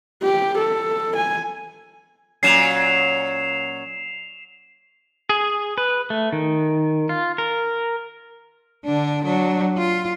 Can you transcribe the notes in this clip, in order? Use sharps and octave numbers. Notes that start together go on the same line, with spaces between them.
G4
A4
G#5
A#2 F#3 C#4 C7 E7 F7
G#4
B4
A3
D#3
F4
A#4
D3 D4
F#3 D4
F4